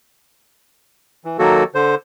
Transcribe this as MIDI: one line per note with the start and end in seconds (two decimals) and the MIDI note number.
1.25 1.37 52
1.39 1.64 51
1.39 1.64 54
1.39 1.64 58
1.39 1.64 66
1.39 1.64 69
1.75 1.95 50
1.75 1.95 72